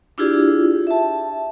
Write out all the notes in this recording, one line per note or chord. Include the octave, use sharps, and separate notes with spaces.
D4 E4 F4 G4 G#4 D5
E5 A5